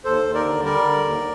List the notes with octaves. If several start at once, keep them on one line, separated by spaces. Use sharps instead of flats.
D#2 A4 C5
D#2
A#4 D5
D3
G3 A#4 D5
D3
D#2